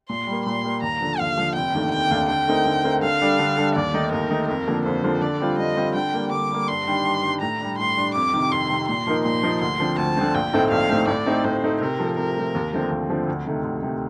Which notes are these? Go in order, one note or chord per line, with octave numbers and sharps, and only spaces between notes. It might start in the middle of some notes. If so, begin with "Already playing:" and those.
A#2 C6
G3 A#3
A#2 C6
G3 A#3
D#2 A#5
D3 F3
D#2 F5
D3 F3
F1 G5
D#2 D#3 A3 D4
F1 G5
D#2 D#3 A3 D4
D3 G5
A3 C4 D#4 A#4
D3
A3 C4 D#4 A#4
D3 F5
G3 D4 A4
D3
G3 D4 A4
D#2 D5
D#3 A3 D#4
D#2 A#4
D#3 A3 D#4
F2 A#4
D3 F3 A#3
F2 C5
D3 F3 A#3
D3 D5
G3 C4 F4
D3 D#5
G3 C4 F4
D3 G5
G3 A#3
D3 D6
G3 A#3
G2 C6
D#3 G3 D4 G4
G2
D#3 G3 D4 G4
A2 A#5
G3 D4
A2 C6
G3 D4
F2 D6
C3 D#3
F2 C6
C3 D#3
A#2 C6
F3 A#3 D#4 A#4
A#2 C6
F3 A#3 D#4 A#4
D2 C6
D3 F3 C4
D2 A5
D3 F3 C4
A#1 G5
A2 A3 C4 D#4
A#1 F5
A2 A3 C4 D#4
A2 D5
A3 C4 D#4 A4
A2 C5
A3 C4 D#4 A4
C3 A#4
F3 A3
C3 A#4
F3 A3
D#2
D3 F3 A3 C4
D#2
D3 F3 A3 C4
D2
C3 D#3 A3 D#4
D2
C3 D#3 A3 D#4